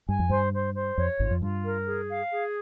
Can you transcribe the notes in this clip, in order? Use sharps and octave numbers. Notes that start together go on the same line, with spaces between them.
G2 G#5
F2
G2 C5
C5
C5
F2 C#5
G#1 G#2 F4
F2
G2 F4
A#4
G#4
F5
G#4